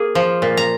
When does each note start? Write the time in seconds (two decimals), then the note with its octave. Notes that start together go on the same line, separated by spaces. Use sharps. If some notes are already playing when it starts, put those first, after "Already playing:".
Already playing: A#3 G#4
0.15 F3
0.42 A#2
0.57 A#5